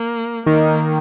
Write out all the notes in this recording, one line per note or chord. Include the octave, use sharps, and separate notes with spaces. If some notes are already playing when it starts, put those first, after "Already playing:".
Already playing: A#3
D#3 A#3